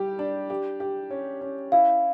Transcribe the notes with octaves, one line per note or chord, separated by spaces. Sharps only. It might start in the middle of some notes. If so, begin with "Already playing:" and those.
Already playing: G3 G4
D4
G4
G4
C#4
C#4
E4 F5